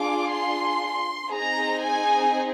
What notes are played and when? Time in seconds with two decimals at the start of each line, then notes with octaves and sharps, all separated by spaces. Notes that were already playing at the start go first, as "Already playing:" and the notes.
Already playing: D4 F4 G#4 D6
0.32 C6
1.33 C4 D#4 G#4 A#5
1.84 G#5